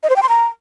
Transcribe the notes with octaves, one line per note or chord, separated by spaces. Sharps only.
D#5
C5
G5
C6
A#5